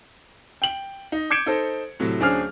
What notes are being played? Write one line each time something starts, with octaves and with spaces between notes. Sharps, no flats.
G5 F#7
D#4
D6 G6 G#6 C#7 D7 E7
D#4 A4 C5
A2 C3 F#3
D1 C#4 D4 G#4 C5 F6